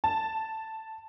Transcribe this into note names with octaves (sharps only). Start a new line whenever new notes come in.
A5